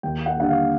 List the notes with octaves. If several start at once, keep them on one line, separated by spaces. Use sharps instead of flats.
D#2 G5
F#5
D3 G3 F#5
F5